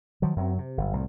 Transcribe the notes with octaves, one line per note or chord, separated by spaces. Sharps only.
D#3 F3 F#3
F#2 F#3 C4
C3
G1 F#2
C2 A2